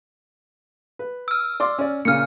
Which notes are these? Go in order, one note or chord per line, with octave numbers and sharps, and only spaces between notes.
B4
E6 F6
D5 C6 D6
C#4 D5
A#2 C#3 F6 C#7